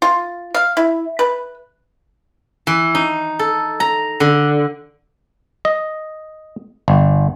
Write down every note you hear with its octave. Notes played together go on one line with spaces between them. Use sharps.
F4
F5
E4
B4
E3
D#4
A4
A#5
D3
D#5
G1